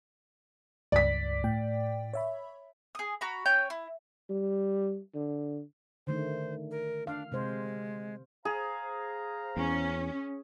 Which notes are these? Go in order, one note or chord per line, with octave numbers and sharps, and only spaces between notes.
C#2 G2 D5 B6
A2 G5
C#5 E5 B5
G#4 D#6
F#4 A#5 B5
C#4 C#5 G5 G6
E4
G3
D3
D3 D#3 A3 C5
A#4
D4 F5
C3 G#3 C5
G#4 C5 F5 A#5
E2 C#4